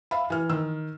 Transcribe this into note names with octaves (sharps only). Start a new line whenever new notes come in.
E5 F5 B5
E3 F6
D#3 E6